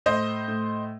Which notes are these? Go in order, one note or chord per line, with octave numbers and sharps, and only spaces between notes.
A2 C5 D#5
A2